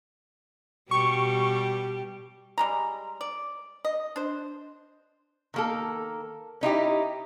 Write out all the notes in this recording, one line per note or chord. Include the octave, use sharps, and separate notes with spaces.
B2 G3 G4 C#6
G3 G#3 A#5
D5
D#5
D4 C5
D#3 A#3 A4
C#4 D#4 E4 G4